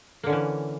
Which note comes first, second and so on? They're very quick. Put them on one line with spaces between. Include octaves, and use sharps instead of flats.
A#3 D3 C#4 E3